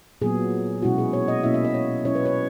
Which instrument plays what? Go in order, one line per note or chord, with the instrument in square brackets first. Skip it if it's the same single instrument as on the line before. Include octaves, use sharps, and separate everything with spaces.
[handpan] A#2 F#3 B3 G#4
B2 G#3 C#4 E4 F#4
G#4
C#5
D#5
B2 A#3 C#4 E4 E5
E5
D#5
C#5
F#3 C#4 E4 C#5
B4
C#5